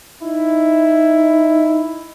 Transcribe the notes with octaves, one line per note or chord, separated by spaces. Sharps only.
D#4 E4